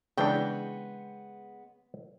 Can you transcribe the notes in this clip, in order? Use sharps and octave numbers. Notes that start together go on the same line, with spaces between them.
C#3 E3 G#3 B3 D4 C#5 G5